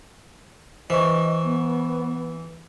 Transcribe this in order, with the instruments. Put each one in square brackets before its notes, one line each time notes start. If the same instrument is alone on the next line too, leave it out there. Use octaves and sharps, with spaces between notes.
[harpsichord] E3 [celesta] C5 C#6 [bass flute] D#5
[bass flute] B3